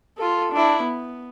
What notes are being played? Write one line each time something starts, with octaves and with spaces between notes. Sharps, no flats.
F4 A4
D4 E4
B3